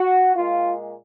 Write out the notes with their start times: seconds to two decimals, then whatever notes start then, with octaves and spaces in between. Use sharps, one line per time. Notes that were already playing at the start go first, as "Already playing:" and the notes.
Already playing: F#4
0.36 A#2 G#3 F4